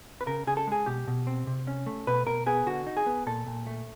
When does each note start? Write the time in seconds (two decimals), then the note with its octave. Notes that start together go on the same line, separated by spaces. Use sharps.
0.21 B4
0.27 C#3 A#4
0.47 C#3 G#4
0.57 A4
0.67 G#3 G#4
0.86 B2 G4
1.07 B2
1.27 C4
1.47 C3
1.67 C#4
1.86 A3
2.07 B2 B4
2.27 B2 A#4
2.46 B3 G#4
2.67 D3 F#4
2.87 D#4
2.97 G#4
3.06 B3
3.27 A#2 A4
3.47 A#2
3.67 A3